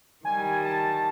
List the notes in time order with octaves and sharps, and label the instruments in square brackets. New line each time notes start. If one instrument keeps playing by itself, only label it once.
[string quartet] D#3 G3 [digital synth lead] G#5
[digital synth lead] A5